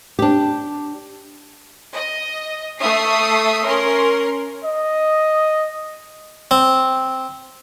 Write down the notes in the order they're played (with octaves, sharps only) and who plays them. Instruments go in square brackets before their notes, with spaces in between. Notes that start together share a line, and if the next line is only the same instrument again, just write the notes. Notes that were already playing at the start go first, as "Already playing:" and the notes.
[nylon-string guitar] D4 G4
[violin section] D#5
A3 E5 D#6 C7
C#4 A#4 C6
[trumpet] D#5
[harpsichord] C4